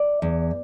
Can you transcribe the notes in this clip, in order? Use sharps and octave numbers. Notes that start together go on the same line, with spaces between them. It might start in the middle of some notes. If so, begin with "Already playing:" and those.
Already playing: D5
E2